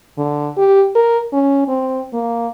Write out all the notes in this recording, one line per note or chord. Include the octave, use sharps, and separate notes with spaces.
D3
G4
A#4
C#4
C4
A#3